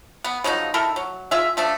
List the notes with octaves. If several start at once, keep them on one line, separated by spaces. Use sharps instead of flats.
B3
C#3 F3 F#3 D#4
D#3 E4 A4 A#4
F#3
F4 G#4 E5
F3 A3 D4